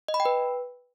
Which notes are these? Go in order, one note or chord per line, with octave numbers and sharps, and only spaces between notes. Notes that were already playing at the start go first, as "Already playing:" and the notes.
D#5
B5
G5
B4